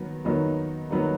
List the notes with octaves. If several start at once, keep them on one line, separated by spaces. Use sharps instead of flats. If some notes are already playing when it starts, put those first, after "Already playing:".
Already playing: D#3 F#3 B3
D#3 F#3 B3 D#4
D#3 F#3 B3 D#4